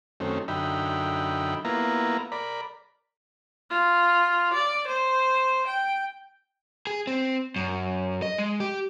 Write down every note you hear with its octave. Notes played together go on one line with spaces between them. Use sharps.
F#2 D#3 A3 C4 C#4
F#2 D3 D#4 E5 G5 B5
A#3 B3 E4 F4 A#5
A#4 D5 B5
F4
D5
C5
G5
G#4
C4
F#2
D#5
G#3
G4